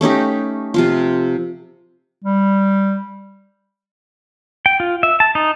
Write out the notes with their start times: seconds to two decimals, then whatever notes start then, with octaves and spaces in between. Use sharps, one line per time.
0.01 A3 C#4 D#4 G4
0.74 C3 F3 F4
2.24 G3
4.66 G5
4.80 F4
5.03 E5
5.20 A5
5.35 D#4